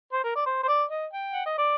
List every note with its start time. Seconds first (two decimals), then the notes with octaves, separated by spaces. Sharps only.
0.13 C5
0.24 A#4
0.36 D5
0.46 C5
0.63 C5
0.68 D5
0.91 D#5
1.13 G5
1.33 F#5
1.46 D#5
1.58 D5